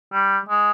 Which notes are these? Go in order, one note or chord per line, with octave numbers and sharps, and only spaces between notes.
G3
G#3